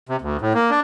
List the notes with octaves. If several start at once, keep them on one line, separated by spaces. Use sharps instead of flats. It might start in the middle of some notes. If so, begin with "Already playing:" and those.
C3
D2
A2
A#3
D4